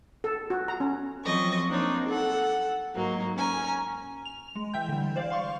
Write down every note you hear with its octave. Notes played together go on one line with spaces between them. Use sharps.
A4
F#4
A#5
C#4
F3 F#3 C4 A4 D#5 C#6
A#3 C4 D4 D#4 C#5
A4 F#5
G#2 F#3 A#3 D#4
C#4 G#5 A#5
F7
G#3
E3 E5 G5 G6
D3 G3
C5 D5 F5
F5 C6 C#6